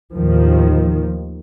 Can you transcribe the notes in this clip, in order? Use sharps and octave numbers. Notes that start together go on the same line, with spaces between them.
D#2 A2 D#3 F3